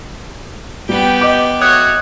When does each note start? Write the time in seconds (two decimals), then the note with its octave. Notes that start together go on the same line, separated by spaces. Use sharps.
0.89 G3 B3 G4 G5
1.21 D#5 D6
1.61 A3 F#4 C#5 D#6 F#6 G#6